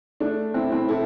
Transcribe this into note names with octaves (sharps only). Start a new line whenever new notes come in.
A3 D4
C4 E4
C4 E4
E4 A4